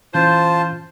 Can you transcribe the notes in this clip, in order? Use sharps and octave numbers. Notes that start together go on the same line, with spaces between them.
A#2 E3 C#4 F4 C5 A5 G6